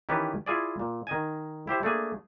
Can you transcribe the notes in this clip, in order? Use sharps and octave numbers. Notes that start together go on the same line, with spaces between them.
D#3 E3 C#4 G4 B4 A5
E4 F4 G#4 D5
A#2
D#3 D#5 G#5
E4 G4 C5 E5
A3 A#3 D4 G#4